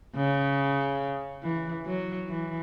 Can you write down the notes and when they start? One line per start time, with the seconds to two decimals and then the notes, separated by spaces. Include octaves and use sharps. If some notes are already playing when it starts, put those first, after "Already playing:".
0.16 C#3
1.42 E3
1.86 F#3
2.28 E3